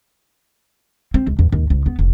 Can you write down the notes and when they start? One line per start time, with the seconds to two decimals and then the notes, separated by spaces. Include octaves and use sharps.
1.14 C4
1.27 C#2
1.39 E2
1.52 D#2
1.70 C#2
1.86 B3
1.99 F1